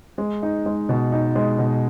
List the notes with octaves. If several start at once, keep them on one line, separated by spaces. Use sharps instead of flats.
G#3
D#4
G#3
B2
D#4
G#3
B2